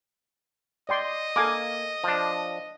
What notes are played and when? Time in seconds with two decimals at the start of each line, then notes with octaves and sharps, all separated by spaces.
0.89 D5 D#5 G5 C6
1.36 A#3 A4 G#5 D6
2.04 F3 D4